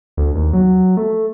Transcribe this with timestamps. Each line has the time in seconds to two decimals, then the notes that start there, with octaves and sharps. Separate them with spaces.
0.17 D2
0.35 D#2
0.53 F#3
0.97 A3